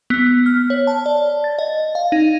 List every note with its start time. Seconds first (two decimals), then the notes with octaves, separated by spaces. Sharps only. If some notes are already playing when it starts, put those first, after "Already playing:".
0.10 B3
0.46 F6
0.70 C#5
0.87 A5
1.06 D5
1.44 A6
1.59 D#5
1.95 F5
2.12 D#4